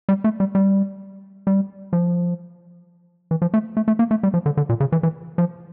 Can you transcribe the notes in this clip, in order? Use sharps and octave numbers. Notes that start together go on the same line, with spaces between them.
G3
A3
G3
G3
G3
F3
E3
F3
A3
A3
A3
A#3
A3
G3
F3
D3
D3
A#2
C#3
E3
E3
F3